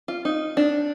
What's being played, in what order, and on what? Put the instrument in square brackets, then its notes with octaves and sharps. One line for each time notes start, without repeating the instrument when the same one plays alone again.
[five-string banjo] F4
D#4
D4